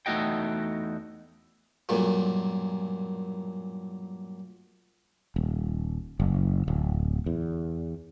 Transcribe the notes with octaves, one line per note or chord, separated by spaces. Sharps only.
E2 A3 D#4 F#4 D#5 G5
B1 G2 A#2
D#1
F#1
D1
E2